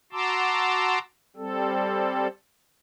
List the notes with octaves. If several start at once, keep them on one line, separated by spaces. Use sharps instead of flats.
F#4 A5 A#5 C6 D6 E6
G3 C4 A4